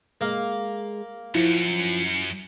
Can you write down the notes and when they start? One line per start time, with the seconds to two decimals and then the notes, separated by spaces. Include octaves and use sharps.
0.21 G#3 A#3 F5
1.35 F#2 F3 E4